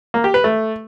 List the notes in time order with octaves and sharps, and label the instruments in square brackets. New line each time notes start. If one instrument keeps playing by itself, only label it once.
[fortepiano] A#3
G4
B4
A3